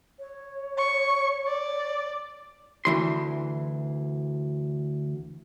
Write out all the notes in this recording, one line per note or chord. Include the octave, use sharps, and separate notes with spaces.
C#5
C#6
D5
D2 E3 C6